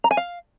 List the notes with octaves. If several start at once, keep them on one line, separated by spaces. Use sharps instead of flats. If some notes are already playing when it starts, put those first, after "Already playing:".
A#5
G#5
F5